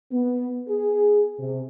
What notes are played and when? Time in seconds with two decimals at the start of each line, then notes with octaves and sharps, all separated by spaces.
0.12 B3
0.69 G#4
1.38 C3